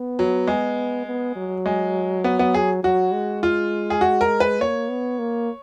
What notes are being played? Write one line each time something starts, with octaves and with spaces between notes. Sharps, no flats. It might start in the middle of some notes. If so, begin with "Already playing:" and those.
Already playing: B3
F#3
G#3
B3
F#3
G#3
B3
B3
G#4
F#3 F#4
G#3
F4
G#4
F#4
A#4
B4
A#3 C#5
B3
A#3